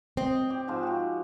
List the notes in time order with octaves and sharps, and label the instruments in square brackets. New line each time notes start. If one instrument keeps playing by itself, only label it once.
[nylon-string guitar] C4 [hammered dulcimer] D#5
[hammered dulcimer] G4
G#2 F3 G#4
F#4 G4